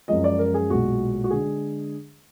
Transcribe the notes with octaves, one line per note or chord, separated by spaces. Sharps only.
F#2 F3 G#3 D#5
D5
A#4
G#4
B1 A#2 G#3 F#4
F#4
D3 G#3 G#4